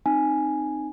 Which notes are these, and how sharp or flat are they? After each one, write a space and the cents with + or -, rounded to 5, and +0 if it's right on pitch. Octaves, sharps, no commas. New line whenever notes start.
C4 +0 D#4 -20 G#5 +0